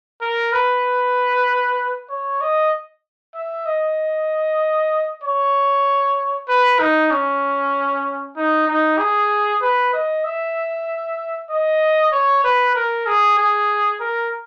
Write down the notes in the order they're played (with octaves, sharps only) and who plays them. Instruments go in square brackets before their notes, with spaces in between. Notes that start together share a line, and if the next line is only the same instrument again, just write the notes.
[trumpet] A#4
B4
C#5
D#5
E5
D#5
C#5
B4
D#4
C#4
D#4
D#4
G#4
B4
D#5
E5
D#5
C#5
B4
A#4
G#4
G#4
A#4